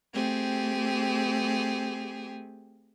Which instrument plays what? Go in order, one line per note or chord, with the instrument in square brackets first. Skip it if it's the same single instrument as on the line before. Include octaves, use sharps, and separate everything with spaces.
[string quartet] A3 C4 G4 G#4